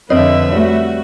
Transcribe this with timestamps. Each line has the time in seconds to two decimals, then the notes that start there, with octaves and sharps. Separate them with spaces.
0.10 F2 D3 C4 B4 C#5 D#5 E5
0.53 G3 A3 F#4